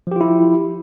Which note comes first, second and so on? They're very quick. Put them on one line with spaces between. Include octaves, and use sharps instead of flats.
F3 G4 F4 E4